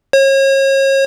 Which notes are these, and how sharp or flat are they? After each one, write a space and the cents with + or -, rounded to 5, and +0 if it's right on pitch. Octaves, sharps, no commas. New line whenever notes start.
C#5 -35